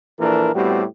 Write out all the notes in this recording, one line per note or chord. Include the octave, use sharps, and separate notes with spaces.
A#1 E3 A#3 D4 A4 A#4
A2 G3 B3 C4 F#4 G4